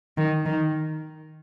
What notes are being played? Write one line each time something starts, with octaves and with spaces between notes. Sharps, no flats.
D#3
D#3